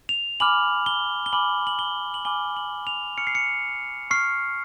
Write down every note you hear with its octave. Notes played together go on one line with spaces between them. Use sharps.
F7
G#5 B5 D6 F6 F#7
G7
G7
G#5 B5 D6 F6 F#7
F#7
G7
F#7
G#5 B5 D6 F6 G7
F#7
F7
C#6 F6 C#7
C7
C#7
C#6 F6 C7